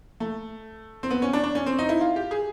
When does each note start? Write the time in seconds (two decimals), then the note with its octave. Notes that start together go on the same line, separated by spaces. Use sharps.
0.20 A3
1.03 C4
1.10 B3
1.22 C#4
1.33 D4
1.44 D4
1.55 C#4
1.66 C4
1.79 D#4
1.89 E4
2.01 F4
2.16 G4
2.31 G#4